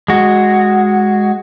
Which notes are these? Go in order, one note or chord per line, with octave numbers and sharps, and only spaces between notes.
G#3 F#4